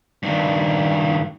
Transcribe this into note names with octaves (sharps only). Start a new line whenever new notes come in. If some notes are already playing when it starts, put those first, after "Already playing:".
G2 D#3